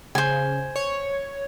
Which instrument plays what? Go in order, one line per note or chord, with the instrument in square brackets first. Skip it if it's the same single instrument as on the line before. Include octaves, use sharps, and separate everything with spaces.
[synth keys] C#3 [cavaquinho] C5 G#5
[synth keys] C#5